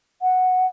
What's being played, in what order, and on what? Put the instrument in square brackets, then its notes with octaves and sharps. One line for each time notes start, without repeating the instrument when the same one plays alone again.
[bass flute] F#5